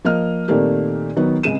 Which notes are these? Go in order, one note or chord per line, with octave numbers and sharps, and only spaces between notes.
F3 A#3 D#5 F6
A#2 D#3 A3 A#3 C4 G4
D#3 F#3 B3
C#2 C3 G#3 D#7 E7